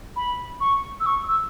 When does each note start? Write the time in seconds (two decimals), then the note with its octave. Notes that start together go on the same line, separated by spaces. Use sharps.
0.16 B5
0.61 C#6
1.00 E6
1.06 C#6
1.28 E6